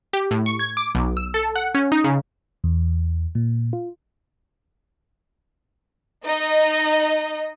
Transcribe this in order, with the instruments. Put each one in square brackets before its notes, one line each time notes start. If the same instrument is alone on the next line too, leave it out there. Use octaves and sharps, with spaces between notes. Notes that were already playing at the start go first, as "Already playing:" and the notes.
[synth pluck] G4
A2
C#6
G#6
D6
B1
E6
A4
F#5
C#4
D#4
C#3
[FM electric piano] E2
A#2
F4
[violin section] D#4 D#5